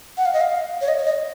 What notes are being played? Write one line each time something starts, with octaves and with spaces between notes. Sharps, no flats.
F#5
F5
D#5
F5
C#5
D#5
C#5
D#5